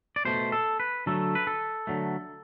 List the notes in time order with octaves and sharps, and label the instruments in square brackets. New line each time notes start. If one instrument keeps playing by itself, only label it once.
[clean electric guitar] D5
B2 A3 C5
A4
B4
D3 F#3 A3 A4
B4
A4
D3 F#3 A3